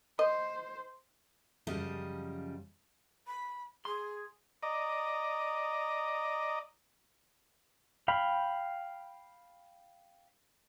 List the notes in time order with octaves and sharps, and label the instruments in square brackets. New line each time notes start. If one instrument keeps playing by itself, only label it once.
[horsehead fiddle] C5 [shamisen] D#5
[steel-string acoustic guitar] F#2 C#3 F3 G3 D#5 A5
[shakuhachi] B5
[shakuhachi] G#4 [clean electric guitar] C6
[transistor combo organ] D5 D#5 A#5
[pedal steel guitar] F5 G5 B5